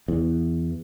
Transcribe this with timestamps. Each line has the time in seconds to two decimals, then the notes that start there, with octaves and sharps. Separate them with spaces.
0.08 E2